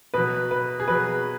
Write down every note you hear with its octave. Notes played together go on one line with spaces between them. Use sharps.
B2 F#3 B4
B4
G#4
B2 F#3 B4